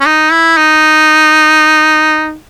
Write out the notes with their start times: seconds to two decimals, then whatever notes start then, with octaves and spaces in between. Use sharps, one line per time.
0.01 C#4
0.06 D#4
0.32 E4
0.57 D#4